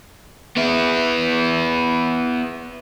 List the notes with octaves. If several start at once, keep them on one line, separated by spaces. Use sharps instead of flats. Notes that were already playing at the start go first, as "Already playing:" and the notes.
B3 E4